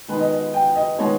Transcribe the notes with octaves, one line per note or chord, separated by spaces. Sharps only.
D#3 G#3 B3 B4
D#5
D#5
G5
D#5
D#3 G#3 B3 C#5